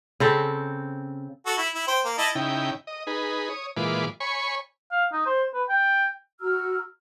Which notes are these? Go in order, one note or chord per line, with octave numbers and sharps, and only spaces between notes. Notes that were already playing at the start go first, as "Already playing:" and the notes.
C#3 C4 A4
F#4 A4
E4
E4
C5 G5
A#3
E4 D#5 A5
C#3 D#4 E4 G5
D#5
D#4 G#4 B4
C#5 D#6
A#2 E3 G#3 F4 B4 D6
C#5 G#5 B5 C#6
F5
D#4
C5
B4
G5
F#4 A#5 E6 F6